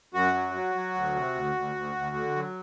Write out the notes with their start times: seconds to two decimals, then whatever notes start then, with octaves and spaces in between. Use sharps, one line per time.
0.14 F#2 F#4
0.34 F#3
0.54 F#3
0.75 F#3
0.94 D2
1.15 C3
1.35 D2
1.55 D2
1.76 D2
1.95 D2
2.16 D3
2.36 F#3